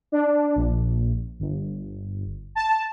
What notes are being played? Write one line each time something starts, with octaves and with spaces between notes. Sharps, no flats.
D4
A#1
G1
A5